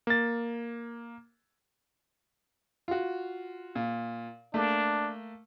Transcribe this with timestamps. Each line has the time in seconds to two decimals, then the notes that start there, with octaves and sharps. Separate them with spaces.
0.07 A#3 A6
2.88 F4 F#4
3.75 A#2
4.54 A3 A#3 D4